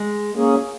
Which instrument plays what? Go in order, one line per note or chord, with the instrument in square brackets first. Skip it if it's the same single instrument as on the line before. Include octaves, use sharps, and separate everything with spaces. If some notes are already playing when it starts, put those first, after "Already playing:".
Already playing: [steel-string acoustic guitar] G#3
[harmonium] A#3 C#4 G#4